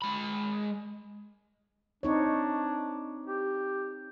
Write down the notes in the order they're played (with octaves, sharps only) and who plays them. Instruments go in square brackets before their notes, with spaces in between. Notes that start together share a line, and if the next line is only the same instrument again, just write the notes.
[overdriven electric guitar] G#3 B5
[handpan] C4 D#4 C#5 [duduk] D4
[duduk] G4